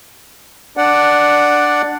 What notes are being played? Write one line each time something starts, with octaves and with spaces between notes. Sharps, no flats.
D4 D5 F#5